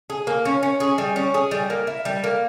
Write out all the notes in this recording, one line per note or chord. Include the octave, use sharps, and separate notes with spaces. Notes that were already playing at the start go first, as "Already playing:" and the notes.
G#4
A#3
C#4
C#4
G#4
G3
C#4
G#4
G3
A#3
E4
G3
A#3